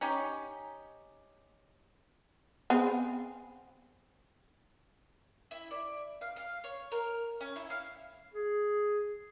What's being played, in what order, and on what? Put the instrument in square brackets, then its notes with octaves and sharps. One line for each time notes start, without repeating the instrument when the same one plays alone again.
[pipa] C#4 D#4 G4
[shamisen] B3 C4 G#4
[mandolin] E4
D5
F5
F5
C#5
A#4
C#4
E4
F5
[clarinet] G#4